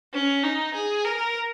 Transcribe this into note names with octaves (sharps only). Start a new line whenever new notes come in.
C#4
D#4
G#4
A#4